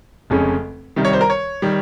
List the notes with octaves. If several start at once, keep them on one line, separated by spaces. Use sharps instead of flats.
F1 F2 C#3 G#3 C#4
C2 C3 D#3 G3
C#5
C5
A#4
C#5
D#3 G3